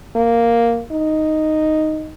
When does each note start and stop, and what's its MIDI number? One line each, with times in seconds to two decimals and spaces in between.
0.16 0.82 58
0.91 2.13 63